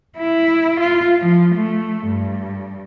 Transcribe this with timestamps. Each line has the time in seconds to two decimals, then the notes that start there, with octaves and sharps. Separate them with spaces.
0.18 E4
0.80 F4
1.20 F3
1.55 A3
2.07 G2